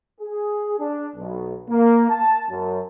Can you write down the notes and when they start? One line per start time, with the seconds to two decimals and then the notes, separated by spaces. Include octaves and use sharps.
0.21 G#4
0.80 D4
1.15 B1
1.69 A#3
2.11 A5
2.50 F#2